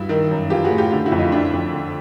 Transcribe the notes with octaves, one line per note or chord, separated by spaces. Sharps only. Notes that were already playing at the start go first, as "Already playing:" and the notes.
Already playing: G2 E4 F#4
D#3
F#2
E3 F4 G4
F#4 G#4
A2
F4 G4
D3
E4 F#4
F2
D#4 F4
D3 D4 E4
F2
D3